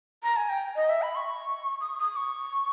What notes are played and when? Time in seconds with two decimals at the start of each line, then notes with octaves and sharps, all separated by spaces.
0.23 A#5
0.37 G#5
0.49 G5
0.76 D#5
0.89 E5
1.02 B5
1.15 C#6
1.81 D#6
1.99 D#6
2.16 C#6